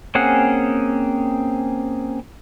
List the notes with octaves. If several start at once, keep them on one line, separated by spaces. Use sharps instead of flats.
A#3 C4 C#4 G#4 F#5